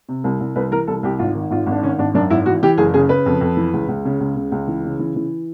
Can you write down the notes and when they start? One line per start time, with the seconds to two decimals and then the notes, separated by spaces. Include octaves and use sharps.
0.09 C3
0.24 C2
0.40 C2
0.56 C2 B4
0.71 E3 A#4
0.87 C2 A4
1.03 C2 G4
1.19 G#1 F4
1.35 D#3
1.51 G#1 F4
1.67 G#1 D4
1.83 D#3 C#4
1.99 G#1 D4
2.14 F#2 D4
2.30 G#1 E4
2.46 E3 F#4
2.63 E3 G4
2.78 F#1 G#4
2.94 C#3 G#4
3.09 C#3 B4
3.26 F2
3.41 F2
3.57 E3
3.73 C#2
3.88 C#2
4.05 C#3
4.20 C#2
4.36 C#3
4.52 C#2
4.68 E3
4.84 C#3
4.99 E3
5.16 E3